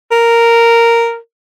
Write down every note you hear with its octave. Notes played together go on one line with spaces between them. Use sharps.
A#4